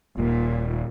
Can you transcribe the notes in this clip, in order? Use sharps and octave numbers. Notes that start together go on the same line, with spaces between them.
D#1 A#2